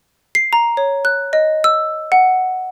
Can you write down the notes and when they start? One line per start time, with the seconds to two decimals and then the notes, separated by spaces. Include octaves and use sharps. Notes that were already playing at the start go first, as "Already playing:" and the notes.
0.35 C7
0.53 A#5
0.77 C#5
1.05 F#6
1.33 D#5
1.64 E6
2.12 F#5